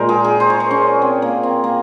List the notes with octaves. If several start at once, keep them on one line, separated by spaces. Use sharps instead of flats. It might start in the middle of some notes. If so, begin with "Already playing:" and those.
Already playing: A#2 G#3 A#4 C5
G#4
G#4
C5
C#5
C5
C#4
C4
A#3
C4
A#3